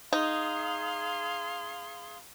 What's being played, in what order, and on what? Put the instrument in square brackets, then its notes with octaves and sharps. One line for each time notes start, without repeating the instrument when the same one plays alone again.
[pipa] D#4 [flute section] G#4 F5 C6